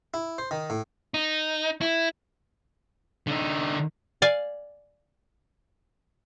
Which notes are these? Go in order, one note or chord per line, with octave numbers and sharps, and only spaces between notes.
E4
C5
D#3
A2
D#4
E4
D3 D#4
D5 F5 G#5